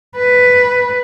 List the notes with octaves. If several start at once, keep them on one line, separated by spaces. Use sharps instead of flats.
B4